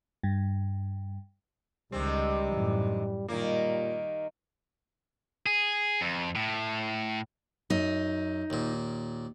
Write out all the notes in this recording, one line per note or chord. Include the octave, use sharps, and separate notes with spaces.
G2
C#2 C3 D#3 G3 C4
F#2 A2 E3
A#2 D#3 G3 A#3
G#4
F2
A2
F#2 D#4
D#2 A#2